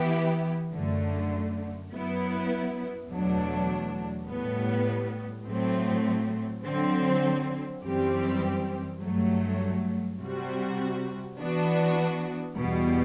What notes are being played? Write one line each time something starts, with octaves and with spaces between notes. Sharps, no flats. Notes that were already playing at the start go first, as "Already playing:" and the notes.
Already playing: E3 B3 E4 G4
F#2 D3 A3
F#2 F#3 B3 E4
E2 B2 F#3 A3 D4
A2 G3 B3
A2 F#3 A3 C4
D3 F#3 C4
F#2 E3 G3 C4 G4
G2 F#3 A3
C3 G3 C4 F#4
E3 B3 D4 F#4
E2 B2 G3